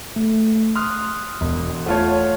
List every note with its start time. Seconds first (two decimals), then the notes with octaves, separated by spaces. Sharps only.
0.16 A3
0.76 C6 D#6 F6 F#6
1.41 E1
1.86 A3 F4 C#5 F#5 A5